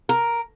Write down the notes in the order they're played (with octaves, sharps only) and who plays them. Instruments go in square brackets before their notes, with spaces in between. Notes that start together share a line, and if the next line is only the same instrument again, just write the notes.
[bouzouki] A#4